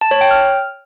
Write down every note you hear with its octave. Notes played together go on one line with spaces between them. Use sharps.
A5
C#5
G5
F6